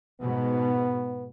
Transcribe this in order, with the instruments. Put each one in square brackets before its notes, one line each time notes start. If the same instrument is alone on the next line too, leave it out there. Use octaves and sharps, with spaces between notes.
[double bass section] G#2 B2 [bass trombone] B3